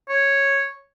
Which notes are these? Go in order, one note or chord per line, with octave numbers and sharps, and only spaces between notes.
C#5